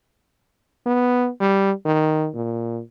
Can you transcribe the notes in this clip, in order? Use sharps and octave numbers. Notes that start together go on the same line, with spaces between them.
B3
G3
D#3
A#2